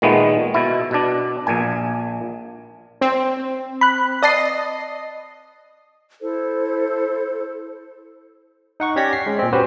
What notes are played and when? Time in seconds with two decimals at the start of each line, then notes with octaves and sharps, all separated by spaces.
0.02 A#2 D#3 G#3 A3 B3
0.54 B2 E4
0.91 B2 D4
1.47 A#1 A#2 G#5
3.01 C4
3.81 B5 F#6
4.23 D5 D#5 A5 C7
6.21 E4 A4 C5
8.80 D#4 F#5 C#6
8.96 C#4 G4 D5 G#6 A#6 B6
9.13 C7
9.26 G#3 C#4
9.39 A#2 C4
9.53 B3 C#4 F#4 G4 B4 C5